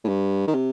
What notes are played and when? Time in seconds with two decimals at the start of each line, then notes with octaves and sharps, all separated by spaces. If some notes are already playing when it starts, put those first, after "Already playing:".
0.04 A2
0.08 G2
0.47 D#3
0.54 C3